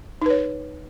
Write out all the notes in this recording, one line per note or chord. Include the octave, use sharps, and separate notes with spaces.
D#4 B4 C#5